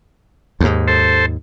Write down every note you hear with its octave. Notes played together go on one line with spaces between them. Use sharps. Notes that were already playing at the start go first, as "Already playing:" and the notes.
D#2 G#2
A4 C5